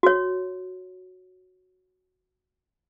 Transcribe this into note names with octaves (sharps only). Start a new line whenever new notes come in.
F#4 C#5